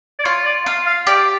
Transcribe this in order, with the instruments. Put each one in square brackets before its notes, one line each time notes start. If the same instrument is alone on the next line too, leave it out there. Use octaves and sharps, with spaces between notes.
[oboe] D5
[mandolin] F4 [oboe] C#5
[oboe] D5
[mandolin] F4 [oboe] F5
[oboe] F5
[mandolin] G4 [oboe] D5